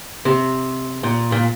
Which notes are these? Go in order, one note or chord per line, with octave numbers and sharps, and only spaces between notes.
C3
A#2
A#2